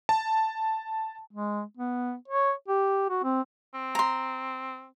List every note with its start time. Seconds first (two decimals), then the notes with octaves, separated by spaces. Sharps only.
0.09 A5
1.32 G#3
1.77 B3
2.28 C#5
2.68 G4
3.10 F#4
3.24 C4
3.74 C4
3.95 A#5 C6